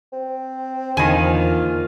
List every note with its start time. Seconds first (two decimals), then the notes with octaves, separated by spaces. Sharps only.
0.13 C4
0.97 E2 D3 D#3 A#3 F4 G#5